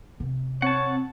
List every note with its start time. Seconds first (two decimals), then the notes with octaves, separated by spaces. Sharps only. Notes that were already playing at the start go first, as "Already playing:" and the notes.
0.20 C3
0.62 C4 C#5 F#5 A5